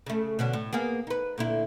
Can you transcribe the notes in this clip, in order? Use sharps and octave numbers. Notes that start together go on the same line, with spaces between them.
C#3 A3
B2 D3 C#4
A2
A#3 B3 G#4
D#4 B4
A#2 D3 E4